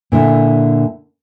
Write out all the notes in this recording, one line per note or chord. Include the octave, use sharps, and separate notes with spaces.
A#2 D3 E4